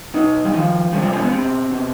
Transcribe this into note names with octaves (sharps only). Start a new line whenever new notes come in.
B2 D#4
G3
C3 D#3 F3
C3 F3 G3
G3
G#3
B3
B2 C4
B2